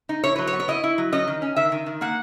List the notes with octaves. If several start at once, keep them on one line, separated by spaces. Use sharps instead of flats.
D#4
E4 C#5
F#3 B4
C#5
B3
C#5
E4 D#5
E4
F#3
C#4 D#5
D#3
C#4
D#3 E5
D#3
D#3
A#3 F#5